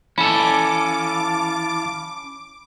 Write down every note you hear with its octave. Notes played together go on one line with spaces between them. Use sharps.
E3 C#4 A4 F5 A5 B5 D6